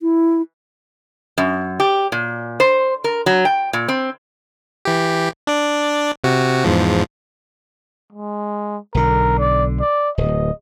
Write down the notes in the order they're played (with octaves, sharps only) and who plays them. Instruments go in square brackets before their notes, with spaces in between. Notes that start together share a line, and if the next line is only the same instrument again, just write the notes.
[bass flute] E4
[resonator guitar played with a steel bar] F#2
G4
A#2
C5
A#4
F#3
G5
A#2
C4
[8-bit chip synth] E3 G4
D4 D5
C3 F#4
E2 G#2 F3
[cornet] G#3
[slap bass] B1 D3 [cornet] A#4
[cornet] D5
D5
[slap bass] D1 [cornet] D#5